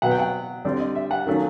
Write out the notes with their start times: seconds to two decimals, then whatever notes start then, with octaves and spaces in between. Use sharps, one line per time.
0.02 B2 F#3 B3 F#5
0.11 G5
0.19 F#5
0.65 D3 G3 C4 D5
0.80 D#5
0.95 E5
1.11 F#5
1.27 D#3 F#3 A3 C#4 F5